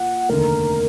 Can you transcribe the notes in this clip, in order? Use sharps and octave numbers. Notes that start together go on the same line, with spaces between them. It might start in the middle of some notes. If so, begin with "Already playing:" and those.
Already playing: A#2 F#5
F1 D#2 D3 A#4